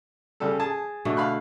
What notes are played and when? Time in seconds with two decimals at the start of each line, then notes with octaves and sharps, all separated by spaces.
0.40 C#3 G3 A4
0.60 G#4 A5
1.05 B2 D3 A3
1.17 F5 B5 F#6